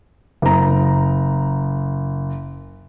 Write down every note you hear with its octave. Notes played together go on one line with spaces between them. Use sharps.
F#1 A#5